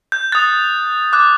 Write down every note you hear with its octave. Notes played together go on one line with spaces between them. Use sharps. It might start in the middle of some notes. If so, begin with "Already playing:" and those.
G6
D#6 F#6 A6
D6 F#6